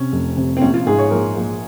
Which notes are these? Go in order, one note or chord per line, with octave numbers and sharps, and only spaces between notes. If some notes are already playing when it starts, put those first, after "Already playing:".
Already playing: C3 C#4
F1
C3
C4
A#1 C#4
F4
G#2 G#4
C#5
A#1 A#4
A#1